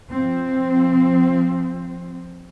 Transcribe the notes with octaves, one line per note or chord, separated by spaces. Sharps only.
F3 C4